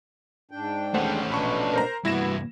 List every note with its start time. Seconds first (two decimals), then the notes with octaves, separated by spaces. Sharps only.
0.51 G#2 D4 G5
0.94 D#2 A3 C#4 C5 F#5
1.30 A#1 B2 D4 B5 C#6
1.73 A#4 C5 A#5
2.05 C2 G2 B3 E4 F#4 A#6 E7